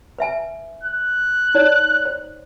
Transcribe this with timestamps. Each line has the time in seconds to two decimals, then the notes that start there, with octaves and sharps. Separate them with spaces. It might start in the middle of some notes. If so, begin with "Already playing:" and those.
0.19 B4 E5 G#5
0.83 F#6
1.54 D#4 C#5 D5
2.05 C5